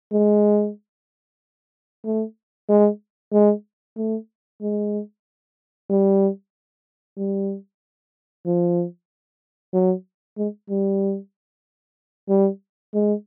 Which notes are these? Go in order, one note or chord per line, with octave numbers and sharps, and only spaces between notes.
G#3
A3
G#3
G#3
A3
G#3
G3
G3
F3
F#3
G#3
G3
G3
G#3